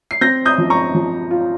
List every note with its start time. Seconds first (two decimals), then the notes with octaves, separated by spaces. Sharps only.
0.11 C7
0.21 C4 G6 A#6
0.46 D#6 G6
0.58 F3
0.70 A#5 C#6
0.95 F3
1.31 F4